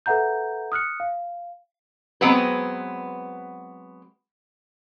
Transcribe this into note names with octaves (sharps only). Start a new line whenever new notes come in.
A4 B4 E5 F#5 A#5 G6
D#6 F6 F#6 C#7
F5
F#3 G#3 B3 C4 B4